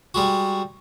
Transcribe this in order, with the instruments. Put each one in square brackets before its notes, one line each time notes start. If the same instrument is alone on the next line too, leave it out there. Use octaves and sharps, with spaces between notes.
[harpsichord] G3 G#3 F#4